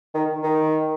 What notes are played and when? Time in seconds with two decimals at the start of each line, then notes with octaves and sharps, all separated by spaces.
0.15 D#3
0.43 D#3